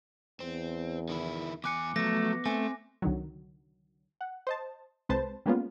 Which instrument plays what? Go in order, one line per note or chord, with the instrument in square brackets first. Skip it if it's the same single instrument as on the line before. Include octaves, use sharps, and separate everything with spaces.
[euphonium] E2 [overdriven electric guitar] C4
[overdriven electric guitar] D#3 E4
[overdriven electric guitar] E2 G#5 [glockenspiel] D6 F#6 C#7
[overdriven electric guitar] F3 F#3 [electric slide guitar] A3 [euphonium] B3 [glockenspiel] A#6
[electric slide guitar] A3 [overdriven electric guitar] C4 [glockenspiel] G#5
[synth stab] C2 D3 D#3 F#3
F#5
C5 D#5 A5
C2 G#3 C4 B4 C5 A5
G3 G#3 A#3 B3 C#4 F4